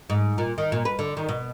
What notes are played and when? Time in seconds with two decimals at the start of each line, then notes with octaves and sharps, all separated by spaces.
0.10 G#2
0.38 A#2
0.58 D#3
0.72 A#2
0.85 B4
0.99 D3
1.17 D#3
1.29 B2